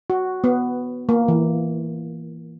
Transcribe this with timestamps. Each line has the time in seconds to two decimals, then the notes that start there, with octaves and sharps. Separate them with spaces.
0.10 F#4
0.44 B3
1.09 A#3
1.28 E3